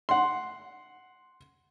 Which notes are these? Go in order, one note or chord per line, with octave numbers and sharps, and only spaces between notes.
F#5 C6